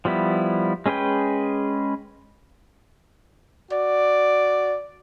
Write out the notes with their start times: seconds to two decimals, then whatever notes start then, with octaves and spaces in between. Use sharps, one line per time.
0.05 F3 G3 B3 E4
0.86 G#3 C#4 G#4 B4 G5
3.72 F#4 D5